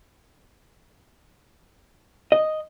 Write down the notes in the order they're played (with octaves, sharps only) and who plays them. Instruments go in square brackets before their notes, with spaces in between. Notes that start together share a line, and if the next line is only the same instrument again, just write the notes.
[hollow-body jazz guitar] D#5